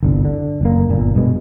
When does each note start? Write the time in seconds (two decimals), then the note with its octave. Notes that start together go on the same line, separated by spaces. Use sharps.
0.03 G1 C2 D3
0.25 D3
0.61 F#1 A#3
0.89 G1 A#2
1.15 G2 B2 G#3